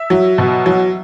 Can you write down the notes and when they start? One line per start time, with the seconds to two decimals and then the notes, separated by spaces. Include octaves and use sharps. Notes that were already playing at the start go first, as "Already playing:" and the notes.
Already playing: E5
0.10 F#3
0.38 B2
0.66 F#3